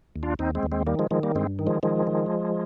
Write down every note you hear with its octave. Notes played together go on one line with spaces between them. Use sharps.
D#2
D4 F4
D#2 C4 D#4
G#3 C4
D#2
G#3 C4
D#3 G3 A#3
F3 G#3
D#3 F3 G#3
G3 A#3
G2 G#3 C4
D#3
F3 G#3
D#3 F3 G#3
D#3